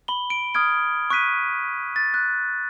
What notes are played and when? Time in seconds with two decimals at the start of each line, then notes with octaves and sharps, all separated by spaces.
0.08 B5 G7
0.30 D7
0.54 D#6 F6 G#6 D7
1.10 C#6 F#6 B6 D#7
1.96 A6
2.14 F#6